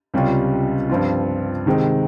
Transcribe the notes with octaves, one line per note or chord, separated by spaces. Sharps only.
C#2 C3 G3 C#4 F4
G2 F3 C4 F4
C3 D#3 G#3 C4